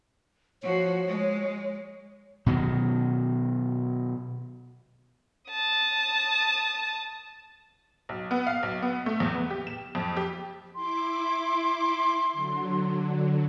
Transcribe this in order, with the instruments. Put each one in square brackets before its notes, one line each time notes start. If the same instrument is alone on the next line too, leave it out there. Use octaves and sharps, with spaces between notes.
[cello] F3 F#4 [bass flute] C#5
[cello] G#3
[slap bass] B2 D#3 F#3
[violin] A5 D#6
[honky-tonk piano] B1
B3
F5
B1
B3
A3
E2
B3
G4
E7
F2
G4
[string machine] E4 D6 [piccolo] C6
[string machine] D3 F#3